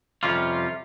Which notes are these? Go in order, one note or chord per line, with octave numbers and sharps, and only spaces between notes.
F2 C3 G3 C#4 F4